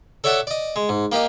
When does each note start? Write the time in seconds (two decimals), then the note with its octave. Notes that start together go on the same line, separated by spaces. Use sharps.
0.24 A4 C#5 D5 E5 F#5 A5
0.47 D5 D#5
0.76 G#3
0.89 G#2
1.12 A#3 G4 A#4 D#5